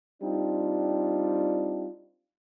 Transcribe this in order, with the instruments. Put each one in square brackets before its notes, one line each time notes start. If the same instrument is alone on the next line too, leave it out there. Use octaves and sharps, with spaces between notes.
[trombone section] G3 C4 D4 D#4 F4